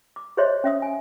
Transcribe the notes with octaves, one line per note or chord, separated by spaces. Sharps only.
D6
G#4 C5 C#5 D#5 E5 C6
C#4 E5 D#6
G#5